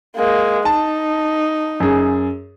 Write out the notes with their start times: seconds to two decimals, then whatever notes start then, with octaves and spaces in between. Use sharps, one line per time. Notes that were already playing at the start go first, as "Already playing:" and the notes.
0.16 G#3 A#3
0.65 D#4 A5
1.80 F#2 G#4